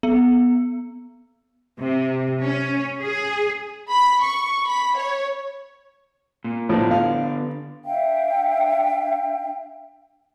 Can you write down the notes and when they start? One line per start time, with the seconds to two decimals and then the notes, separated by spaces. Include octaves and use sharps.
0.03 B3
1.80 C3
2.43 C#4
3.01 G#4
3.90 B5
4.22 C#6
4.66 B5
4.98 C#5
6.44 A#2
6.69 A2 D3 F3 B3 D4
6.91 F5
7.85 D4 E5 F5 G5